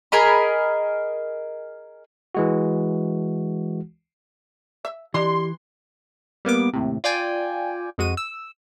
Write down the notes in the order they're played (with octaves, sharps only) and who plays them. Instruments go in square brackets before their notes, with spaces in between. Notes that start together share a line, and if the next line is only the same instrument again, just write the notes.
[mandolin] G#4 A#4 D#5 B5
[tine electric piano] E3 G#3 F#4
[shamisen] E5
[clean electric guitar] E3 [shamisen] D4 D#5 [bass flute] G4 [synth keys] C6
[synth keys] G3 A#3 B3 D6
D#2 A2 C3
F4 D5 G5 G#5
F2 G#3 F#4 D#7
E6